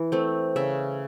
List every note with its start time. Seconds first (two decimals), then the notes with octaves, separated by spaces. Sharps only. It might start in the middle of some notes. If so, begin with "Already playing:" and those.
Already playing: E3
0.12 A3 C4
0.56 C#3 E5